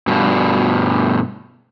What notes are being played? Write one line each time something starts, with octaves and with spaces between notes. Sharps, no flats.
G2 B2